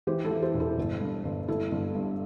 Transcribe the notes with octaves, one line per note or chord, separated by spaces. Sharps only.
E3 G4 C5
E4 A4
E3
G4 C5
E1
E4 A4
G1
G2
G1
G1 E4 A4
G1
G2